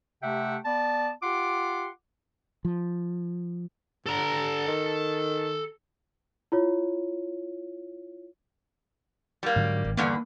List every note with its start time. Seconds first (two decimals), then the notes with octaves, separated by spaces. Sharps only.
0.23 C3 A3 G4 E5 F#5 G5
0.65 B3 D5 A5
1.23 F4 G4 F#5 C6 D6
2.65 F3
4.06 D3 A4 A#5
4.68 D#3
6.52 E4 F4 C#5
9.43 G3 A#3
9.56 G#2 D3 F#3
9.85 G#1
9.97 E2 G2 D3 A#3